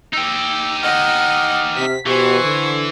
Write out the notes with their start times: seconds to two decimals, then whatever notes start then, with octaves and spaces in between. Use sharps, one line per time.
0.14 D#4 G4 E6
0.82 D#5 F#5 F6
1.77 C3 B6
2.06 B2 E3 G4 C5 G#5 C#6
2.43 D3